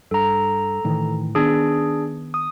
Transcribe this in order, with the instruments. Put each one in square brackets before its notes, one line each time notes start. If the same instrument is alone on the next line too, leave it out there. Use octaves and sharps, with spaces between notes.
[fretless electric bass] G2 [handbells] A4 A#5
[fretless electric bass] A2 D#3 E3
[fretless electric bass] D#3 B3 [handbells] D4 G#4
[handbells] D#6